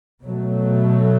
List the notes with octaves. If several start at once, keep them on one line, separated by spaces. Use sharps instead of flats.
B2 F#3 A3